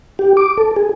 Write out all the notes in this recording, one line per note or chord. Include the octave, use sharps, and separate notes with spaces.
G4
D6
A4
G#4